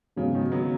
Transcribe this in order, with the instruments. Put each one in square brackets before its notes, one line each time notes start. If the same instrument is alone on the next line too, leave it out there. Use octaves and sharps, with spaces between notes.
[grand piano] G#2 F#3 B3 [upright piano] C#3
[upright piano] D#3
F#3 B3